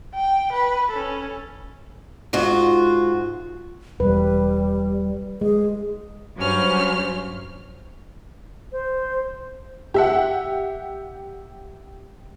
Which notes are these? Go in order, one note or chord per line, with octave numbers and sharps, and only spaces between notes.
G5
B4
C#4 A4
G#2 F4 F#4
E1 G3 B4
G#3 G#4
G2 F#3 C#4 C5 F6
C5
G4 E5 F#5